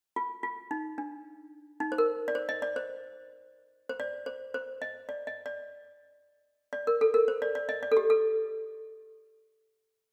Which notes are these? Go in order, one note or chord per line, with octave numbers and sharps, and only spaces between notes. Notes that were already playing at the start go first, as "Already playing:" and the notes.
F4
F4
D#4
D4
D#4
C5
A#4
D5
C5
D#5
D5
C5
C5
D5
C5
C5
D#5
D5
D#5
D5
D5
A#4
A4
A#4
C5
D5
D5
D#5
D5
A4
G4
A4